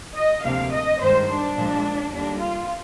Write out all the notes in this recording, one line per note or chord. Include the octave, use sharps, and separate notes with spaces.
D#5
D2 C3 F3 A#3 F5
D#5
G2 D#3 G#3 C5
D4
A#2 F3 G#3
D#2 D3 G3 A#3 D4
F4